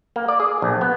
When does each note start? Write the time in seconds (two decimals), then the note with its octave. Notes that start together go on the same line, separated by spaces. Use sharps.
0.16 A#3
0.28 D5
0.40 G#4
0.62 A#1
0.81 B3